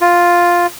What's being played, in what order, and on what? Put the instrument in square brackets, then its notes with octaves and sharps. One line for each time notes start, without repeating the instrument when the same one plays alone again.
[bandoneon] F4